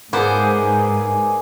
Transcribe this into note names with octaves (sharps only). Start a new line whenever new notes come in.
G#2 A#3 B3 G#4 C5 D5 G#5